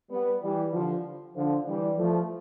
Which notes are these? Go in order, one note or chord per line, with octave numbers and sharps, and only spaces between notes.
G3 B3
E3 G3
D3 F3
D3 F3
E3 G3
F3 A3